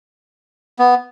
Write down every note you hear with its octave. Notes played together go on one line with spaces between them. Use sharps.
B3